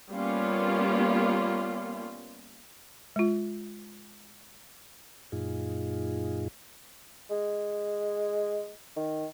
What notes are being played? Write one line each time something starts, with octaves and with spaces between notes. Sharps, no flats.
G3 A#3 B3 C#4 F4
G#3 F4
F#2 A#2 D#4 F4 G#4
G#3
D#3